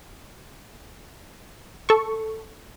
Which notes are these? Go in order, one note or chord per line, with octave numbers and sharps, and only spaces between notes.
A4 C#6